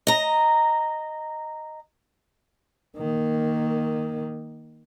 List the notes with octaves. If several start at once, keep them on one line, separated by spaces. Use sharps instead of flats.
D#5 A#5
D#3 A#3